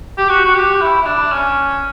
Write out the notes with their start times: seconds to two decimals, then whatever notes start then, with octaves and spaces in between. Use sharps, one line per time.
0.18 G4
0.29 F#4
0.45 F#4
0.55 G4
0.81 E4
1.02 E4
1.06 D4
1.32 C#4